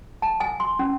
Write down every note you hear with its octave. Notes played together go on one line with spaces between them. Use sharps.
A5
G#5
C6
C#4